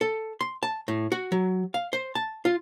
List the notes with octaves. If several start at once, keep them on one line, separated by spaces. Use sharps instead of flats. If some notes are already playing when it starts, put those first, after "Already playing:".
A4
C6
A5
A2
F#4
F#3
F5
C5
A5
F4